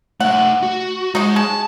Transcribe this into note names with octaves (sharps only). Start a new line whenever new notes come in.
A3 D#4 F#5
F#4
G#3 D#4 F#4
G#3 A5